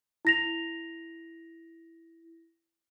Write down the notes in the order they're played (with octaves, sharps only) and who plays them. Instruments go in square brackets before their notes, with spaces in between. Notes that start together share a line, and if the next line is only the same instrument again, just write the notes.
[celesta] E4 A#6 F7